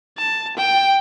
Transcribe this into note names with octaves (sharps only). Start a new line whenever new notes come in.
A5
G5